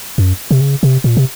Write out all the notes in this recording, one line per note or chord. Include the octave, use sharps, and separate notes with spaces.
F#2
C3
C#3
C3
A#2
C3